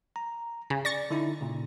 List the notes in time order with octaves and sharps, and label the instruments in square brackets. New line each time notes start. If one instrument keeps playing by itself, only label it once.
[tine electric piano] A#5
[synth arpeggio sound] C#3
[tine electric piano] D5 [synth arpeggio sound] C#6 A6 A#6
[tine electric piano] D3 D#4 E4
A#2 C#3